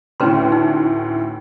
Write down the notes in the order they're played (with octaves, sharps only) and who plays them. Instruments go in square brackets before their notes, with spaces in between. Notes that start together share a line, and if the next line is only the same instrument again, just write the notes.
[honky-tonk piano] D2 A2 [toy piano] C#4 B4 C6
[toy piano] D#4